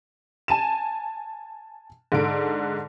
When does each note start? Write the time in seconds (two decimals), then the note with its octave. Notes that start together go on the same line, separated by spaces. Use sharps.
0.48 G#5 A5 D#7 E7
2.12 G#2 D3 D7